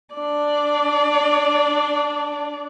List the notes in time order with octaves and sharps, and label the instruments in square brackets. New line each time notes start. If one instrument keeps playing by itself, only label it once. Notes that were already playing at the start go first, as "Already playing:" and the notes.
[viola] D4 D5